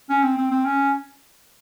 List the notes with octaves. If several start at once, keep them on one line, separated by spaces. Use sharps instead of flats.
C#4
C4
C4
C4
C#4